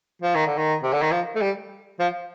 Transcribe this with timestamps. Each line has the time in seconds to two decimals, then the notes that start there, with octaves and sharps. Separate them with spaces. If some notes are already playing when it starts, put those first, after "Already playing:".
0.22 F3
0.35 D#3
0.47 D3
0.58 D#3
0.83 C3
0.93 D3
1.02 D#3
1.11 F3
1.35 A3
1.41 G3
2.00 F3